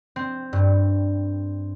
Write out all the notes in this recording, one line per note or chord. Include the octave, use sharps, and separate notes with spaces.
C4
G2